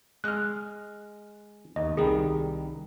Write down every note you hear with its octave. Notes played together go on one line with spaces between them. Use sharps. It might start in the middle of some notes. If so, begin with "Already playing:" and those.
G#3 D#5 F6 F#6
D#2 D#5
C2 D#3 G3 G#4